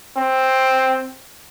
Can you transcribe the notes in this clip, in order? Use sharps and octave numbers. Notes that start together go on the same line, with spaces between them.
C4